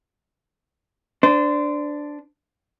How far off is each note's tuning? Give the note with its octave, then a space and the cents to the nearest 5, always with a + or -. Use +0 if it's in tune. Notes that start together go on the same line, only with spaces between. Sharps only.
D4 +0 C5 -25